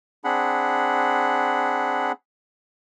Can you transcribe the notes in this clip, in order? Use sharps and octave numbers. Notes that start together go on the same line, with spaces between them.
C4 D4 G#4 F#5 B5